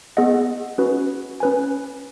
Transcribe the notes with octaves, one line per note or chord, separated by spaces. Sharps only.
B3 G#4 D#5 F#5
C#4 F#4 B4
C#4 B4 G#5